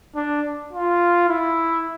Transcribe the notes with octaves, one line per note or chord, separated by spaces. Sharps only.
D4
F4
E4